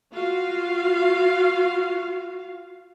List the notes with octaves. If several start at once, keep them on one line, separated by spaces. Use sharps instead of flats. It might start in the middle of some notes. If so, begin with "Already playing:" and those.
F4 F#4 F5